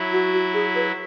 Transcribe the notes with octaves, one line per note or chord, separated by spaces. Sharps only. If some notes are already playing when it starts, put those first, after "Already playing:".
Already playing: F#3 E4
F#4
F#4
G#4
B4